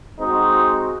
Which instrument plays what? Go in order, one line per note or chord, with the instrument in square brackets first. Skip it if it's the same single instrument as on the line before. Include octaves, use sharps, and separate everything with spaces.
[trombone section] G#3 C4 D#4 F#4